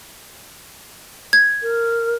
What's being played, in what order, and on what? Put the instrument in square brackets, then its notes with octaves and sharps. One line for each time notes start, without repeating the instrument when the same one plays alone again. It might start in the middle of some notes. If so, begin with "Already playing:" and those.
[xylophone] G#6
[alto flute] A#4